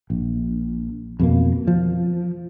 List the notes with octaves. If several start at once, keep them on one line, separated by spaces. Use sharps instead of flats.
A#1
F2 B2 A#3
F3